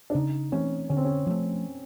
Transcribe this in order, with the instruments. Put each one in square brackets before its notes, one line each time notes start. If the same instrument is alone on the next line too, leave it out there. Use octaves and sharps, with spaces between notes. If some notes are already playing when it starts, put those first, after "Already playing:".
[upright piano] D4
[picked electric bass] C#3 [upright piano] D#4
[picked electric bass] E3 A3 C4 [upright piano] C#4
[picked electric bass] D3 [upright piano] C#4
[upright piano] C4
C#4
[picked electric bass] F3 A3